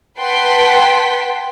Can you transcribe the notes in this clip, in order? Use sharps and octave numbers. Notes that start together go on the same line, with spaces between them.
B4 F#5 G5 A5 C6 B6